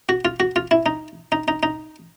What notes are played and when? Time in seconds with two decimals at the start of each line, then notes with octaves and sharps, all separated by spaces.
0.09 F#4
0.25 F4
0.40 F#4
0.56 F4
0.71 E4
0.86 D#4
1.32 D#4
1.48 D#4
1.63 D#4